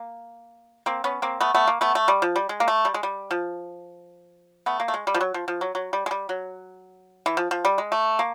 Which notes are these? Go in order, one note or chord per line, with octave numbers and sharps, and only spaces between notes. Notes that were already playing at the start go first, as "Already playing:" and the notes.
Already playing: A#3
A#3 C4
B3 C#4
A#3 C4
A3 B3
A3 B3
A#3
A3 B3
A3
G3
F3
G3
G#3
A#3
A3
G3
G#3
G3
F3
A3 B3
A#3
A3
G#3
G3
F3
F#3
F3
F3
F#3
F#3
G3
G#3
G3
F#3
E3
F3
F3
G3
G#3
A3
A#3